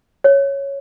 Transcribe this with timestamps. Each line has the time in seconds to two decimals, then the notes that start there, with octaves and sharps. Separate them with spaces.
0.24 C#5